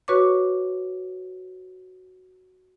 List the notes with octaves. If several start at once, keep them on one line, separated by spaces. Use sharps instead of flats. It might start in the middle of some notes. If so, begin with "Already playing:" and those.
F#4 B4 C#5 C#6 D6